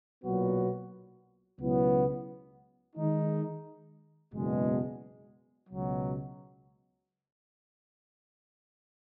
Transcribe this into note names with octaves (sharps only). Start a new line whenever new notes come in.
B1 A#2 F#3 B3 F#4
C#2 B2 F#3 B3 E4
D#3 G#3 D#4
F#1 E2 B2 G#3 B3
C#2 B2 F#3